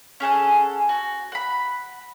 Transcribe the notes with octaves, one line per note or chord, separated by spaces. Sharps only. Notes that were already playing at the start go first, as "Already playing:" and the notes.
C#4 G#4 A4 F#5
F#4
F#5 B5